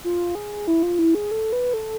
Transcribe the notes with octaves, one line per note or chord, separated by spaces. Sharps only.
F4
G#4
E4
F4
E4
G#4
A4
B4
A4